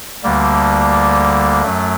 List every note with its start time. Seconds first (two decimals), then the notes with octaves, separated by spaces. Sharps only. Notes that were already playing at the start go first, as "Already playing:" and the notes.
0.24 D2 D3 G3 A#3
1.63 F#2 F#3 A3